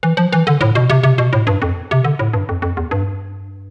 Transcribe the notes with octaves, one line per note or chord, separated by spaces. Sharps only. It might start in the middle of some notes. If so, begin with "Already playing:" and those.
E3
F3
E3
D3
A2
B2
C3
C3
B2
A2
G2
F2
C3
D3
A2
G2
F2
F2
E2
G2